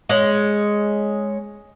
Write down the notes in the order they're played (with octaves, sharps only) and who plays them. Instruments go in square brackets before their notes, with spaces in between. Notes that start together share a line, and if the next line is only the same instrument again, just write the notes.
[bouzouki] G#3 C#4